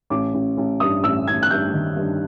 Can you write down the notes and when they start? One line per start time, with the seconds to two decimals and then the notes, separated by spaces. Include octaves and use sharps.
0.10 A1 D6
0.34 A1
0.57 A1
0.80 G2 D#6
1.03 A1 E6
1.27 A1 G#6
1.43 F#6
1.51 G2 G6
1.73 D#3
1.96 G2